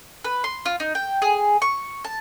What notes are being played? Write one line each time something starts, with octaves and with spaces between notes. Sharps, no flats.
B4
C6
F4
D#4
G5
G#4
C#6
A5